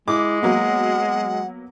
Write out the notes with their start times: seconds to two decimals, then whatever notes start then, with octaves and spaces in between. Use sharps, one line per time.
0.08 G#3 E4 D6
0.42 F#3 A#3 B3 F#5